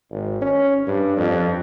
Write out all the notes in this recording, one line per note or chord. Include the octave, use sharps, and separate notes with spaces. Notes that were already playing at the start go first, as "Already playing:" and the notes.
G#1
C#4
G2
F2